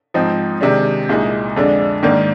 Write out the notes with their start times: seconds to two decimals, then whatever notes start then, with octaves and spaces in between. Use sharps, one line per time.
0.14 G#2 F3 C4 D#4
0.61 C3 D#3 G#3 D4
1.09 C2 A#2 G#3 D#4
1.56 F2 D3 G#3 D4
2.03 G#2 D#3 A#3 D4